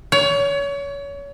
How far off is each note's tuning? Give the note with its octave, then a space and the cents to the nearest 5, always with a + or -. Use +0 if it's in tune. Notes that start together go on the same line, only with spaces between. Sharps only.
C#5 +30